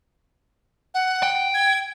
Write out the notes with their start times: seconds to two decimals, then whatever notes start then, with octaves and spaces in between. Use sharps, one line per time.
0.94 F#5
1.23 G5
1.54 G#6